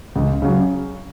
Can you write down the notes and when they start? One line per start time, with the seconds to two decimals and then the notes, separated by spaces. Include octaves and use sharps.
0.15 C#2
0.42 C#3 F#3